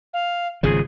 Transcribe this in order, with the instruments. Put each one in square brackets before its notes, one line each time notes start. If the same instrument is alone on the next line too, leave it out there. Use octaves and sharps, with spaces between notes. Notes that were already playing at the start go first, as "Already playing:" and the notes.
[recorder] F5
[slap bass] G#1 C#3 F3 [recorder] G#4